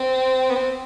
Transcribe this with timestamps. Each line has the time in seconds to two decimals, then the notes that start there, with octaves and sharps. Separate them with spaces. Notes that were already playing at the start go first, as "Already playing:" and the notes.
Already playing: C4
0.50 B3
0.55 C4